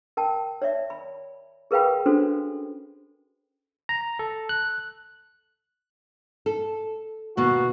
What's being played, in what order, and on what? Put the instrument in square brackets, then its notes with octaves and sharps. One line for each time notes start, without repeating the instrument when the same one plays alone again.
[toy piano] A#4 G5 A5
C#5 D5 E5
B5
G#4 A#4 B4 F5 G5 B5
C#4 D4 F#4 A4 C5
[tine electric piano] A#5
A4
F#6
[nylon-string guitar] A4
[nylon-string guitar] D#2 B2 [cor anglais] F#4